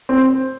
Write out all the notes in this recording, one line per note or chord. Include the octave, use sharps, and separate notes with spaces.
C4